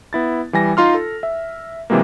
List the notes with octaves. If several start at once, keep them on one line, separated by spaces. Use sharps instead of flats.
B3 E4 A6
E3 G3 G#5 A#6
D#4 F4 C6 F6
A4
E5
C3 E3 F#3 G#3 A#3